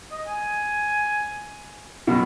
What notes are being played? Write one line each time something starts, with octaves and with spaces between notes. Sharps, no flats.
D#5
G#5
F#2 B2